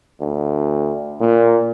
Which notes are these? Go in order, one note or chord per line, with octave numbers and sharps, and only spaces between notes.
D2
A#2